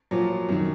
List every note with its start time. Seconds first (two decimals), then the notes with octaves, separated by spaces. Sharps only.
0.11 A#2 F3 F#3
0.49 F#2 D#3